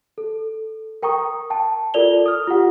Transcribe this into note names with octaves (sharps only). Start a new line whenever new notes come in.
A4
A#4 G5 A#5 C#6 D#6
G5 A5
F4 A4 A#4 D5 F7 G7
D#6 F6
F4 G4 F#5